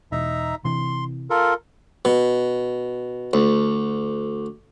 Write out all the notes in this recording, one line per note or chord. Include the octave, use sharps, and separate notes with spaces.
E1 D#4 E5 A#5
C3 E3 C6
F4 A4 A#4
B2
D2